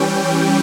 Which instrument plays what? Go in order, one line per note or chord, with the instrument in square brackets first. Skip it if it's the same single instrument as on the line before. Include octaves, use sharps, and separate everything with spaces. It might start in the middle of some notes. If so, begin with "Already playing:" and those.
Already playing: [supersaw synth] E3 G3 C#4 G5